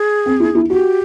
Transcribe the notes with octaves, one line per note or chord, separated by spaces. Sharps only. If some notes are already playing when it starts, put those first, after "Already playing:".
Already playing: G#4
C4
E4
E4
F#4 G4